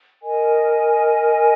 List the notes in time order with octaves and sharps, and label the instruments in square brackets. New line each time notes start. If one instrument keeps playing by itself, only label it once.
[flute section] A#4 D#5 G#5